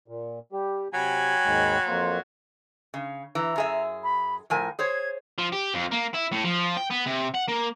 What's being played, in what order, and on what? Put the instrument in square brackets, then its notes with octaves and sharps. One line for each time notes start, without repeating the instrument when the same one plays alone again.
[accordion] A#2
G3 G4
[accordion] C3 [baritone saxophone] F#3 [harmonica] G5 G#5 B5
[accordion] D#2 G#2 G#3
F2 A#3 C5
[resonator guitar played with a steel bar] C#3
[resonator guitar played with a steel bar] E3 [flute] A#5
[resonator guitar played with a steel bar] F#2 G#4 E5
[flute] B5
[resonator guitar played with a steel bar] A2 F3 G#5 [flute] A#4
[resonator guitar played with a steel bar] G#4 C5 C#5 [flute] G#6
[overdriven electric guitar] F3
G4
F2
A#3
E4
A2
F3
G5
B3
C3
F#5
A#3